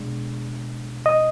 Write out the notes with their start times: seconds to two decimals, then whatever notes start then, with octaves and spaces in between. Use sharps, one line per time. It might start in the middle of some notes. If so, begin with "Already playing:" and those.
Already playing: B2 G#3 D4
1.06 D#5